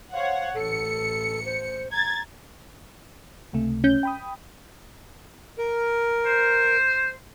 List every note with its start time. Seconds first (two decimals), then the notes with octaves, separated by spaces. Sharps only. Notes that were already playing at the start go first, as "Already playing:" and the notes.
0.13 C5 C#5 F5 F#5
0.54 A1 A4 C#7
1.45 C5
1.92 A#5 G#6 A6
3.53 C#2 C3 A3
3.84 C#4 G6
4.03 G5 B5 D#6
5.58 A#4
6.26 C5